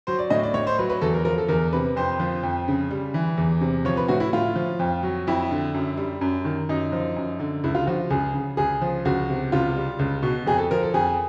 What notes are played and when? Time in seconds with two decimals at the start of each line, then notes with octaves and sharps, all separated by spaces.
0.07 F#3 C5
0.19 D5
0.30 A2 D#5
0.43 D5
0.54 A2 C#5
0.67 C5
0.79 F#3 B4
0.90 B4
1.01 E2 A4
1.14 A#4
1.25 F3 A#4
1.38 A4
1.49 E2 A#4
1.73 C3 B4
1.96 F2 C5
2.20 F3
2.43 F2
2.68 C#3
2.91 G3
3.14 E3
3.38 E2
3.61 C3
3.85 F3 C#5
3.97 B4
4.08 A2 F#4
4.20 E4
4.33 A2 F4
4.56 F3
4.79 F2
5.03 F#3
5.27 F2 E4
5.51 D3
5.74 F#2
5.97 G3
6.21 F#2
6.45 D#3
6.69 F#2 D#4
6.92 F3
7.16 F#2
7.40 D3
7.64 C#2 E4
7.75 F4
7.87 F3 F#4
8.10 C#2 G#4
8.34 C#3
8.57 C#2 G#4
8.81 F3
9.05 C#2 F#4
9.29 C3
9.52 C#2 F4
9.77 G3
9.99 C#2
10.23 B2
10.46 F2 G#4
10.58 A4
10.71 F3 A#4
10.83 A4
10.94 F2 G#4